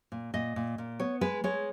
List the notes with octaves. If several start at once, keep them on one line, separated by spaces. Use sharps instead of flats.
A#2
A#2 D#5
A#2
A#2
B3 C#5
G#3 B4
G#3 C#5